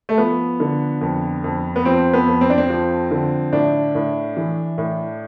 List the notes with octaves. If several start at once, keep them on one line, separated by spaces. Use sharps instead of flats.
A3
F3 B3
D3
F2
F2
B3
F3 C4
B3
F2
C4
D4
C4
F3
D3
A2 D4
A2
E3
A2